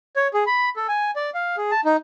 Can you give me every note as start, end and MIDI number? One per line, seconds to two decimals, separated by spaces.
0.16 0.28 73
0.34 0.44 68
0.47 0.69 83
0.76 0.87 69
0.89 1.11 80
1.16 1.30 74
1.34 1.56 77
1.57 1.71 68
1.71 1.81 81
1.85 1.96 63